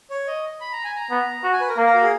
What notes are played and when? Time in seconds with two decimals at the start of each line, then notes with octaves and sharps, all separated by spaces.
0.10 C#5
0.27 D#5
0.61 B5
0.72 A#5
0.84 G#5
0.96 A#5
1.11 B3
1.44 F#4
1.53 G#5
1.61 B4
1.69 A#4
1.77 A#3
1.86 A#4
1.94 F#4
2.02 G#4